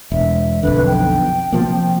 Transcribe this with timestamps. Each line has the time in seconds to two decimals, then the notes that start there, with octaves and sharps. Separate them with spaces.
0.12 E1 E5
0.63 B1 F2 D3 B4
0.87 G5
1.52 C3 F3 A#3